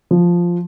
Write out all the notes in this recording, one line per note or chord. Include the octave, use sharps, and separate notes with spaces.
F3